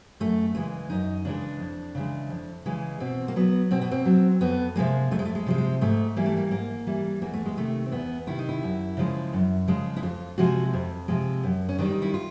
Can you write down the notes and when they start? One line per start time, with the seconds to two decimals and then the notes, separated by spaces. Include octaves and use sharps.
0.20 F#2 A3
0.55 C#3 E3 G#3 A3
0.90 F#2 D#4
1.25 C#3 E3 G#3 D4
1.60 F2
1.95 C#3 E3 G#3
2.30 F2
2.66 C#3 E3 G#3
3.00 B2 C4
3.28 A#3
3.36 F#3 B3
3.71 B2 C4
3.81 B3
3.91 C4
4.05 F#3
4.41 F2 B3
4.76 C3 F3 G#3 A#3
5.11 F2 A3
5.19 G#3
5.25 A3
5.35 G#3
5.46 C3 F3 G#3
5.58 G#3
5.81 G#2 A3
6.16 E3 G3 A#3
6.26 A3
6.37 A#3
6.51 G#2 A#3
6.87 E3 G3
7.22 E2 A#3
7.33 A3
7.45 G#3
7.57 C3 D#3 A3
7.86 C4
7.92 E2 B3
8.27 C3 D#3 E4
8.39 D#4
8.49 E4
8.63 F#2
8.97 C#3 F3 G#3
9.33 F#2
9.68 C#3 F3 G#3
9.96 E4
10.03 F2 F4
10.38 C3 F3 G#3 F#4
10.73 F2
11.08 C3 F3 G#3
11.44 F#2
11.69 C#4
11.78 D#3 G3 D4
11.90 D#4
12.02 E4
12.14 F4